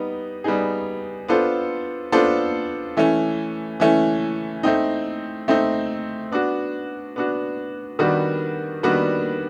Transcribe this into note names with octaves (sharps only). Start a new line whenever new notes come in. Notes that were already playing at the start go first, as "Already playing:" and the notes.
Already playing: G3 B3 D#4
G3 B3 D#4 G#4
B3 D4 F4 A4 C5
B3 D4 F4 A4 C5
E3 A3 C#4
E3 A3 C#4
A3 C4 D#4
A3 C4 D#4
B3 D4 F#4
B3 D4 F#4
D#3 G3 B3 D4 F#4
D#3 G3 B3 D4 F#4